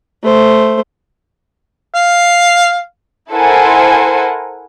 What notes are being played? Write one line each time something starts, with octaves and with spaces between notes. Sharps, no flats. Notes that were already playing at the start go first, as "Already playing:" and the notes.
A3 C5
F5
E4 A4 A#4 C5 F#5 G#5